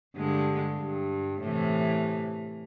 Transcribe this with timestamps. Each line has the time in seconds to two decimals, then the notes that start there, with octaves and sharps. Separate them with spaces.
0.16 G2 D3 G#3
0.80 G2
1.41 A2 C3 E3